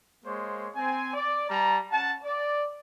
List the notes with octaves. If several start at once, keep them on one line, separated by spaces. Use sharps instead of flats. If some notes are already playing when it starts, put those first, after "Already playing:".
G#3 A#3 C5 C#5
C4 G#5
D5
G3 A5 A#5
C#4 F#5 A5
D5